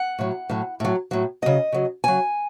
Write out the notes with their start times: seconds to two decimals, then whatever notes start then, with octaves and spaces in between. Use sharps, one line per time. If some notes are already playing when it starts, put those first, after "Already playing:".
Already playing: F#5
0.19 A2 F#3
0.50 A2 F#3
0.80 A2 F#3
1.11 A2 F#3
1.42 C#3 F#3 D#5
1.72 C#3 F#3
2.04 C#3 F#3 G#5